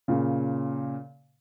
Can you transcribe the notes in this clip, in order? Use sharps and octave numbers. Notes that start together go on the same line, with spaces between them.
A#2 C#3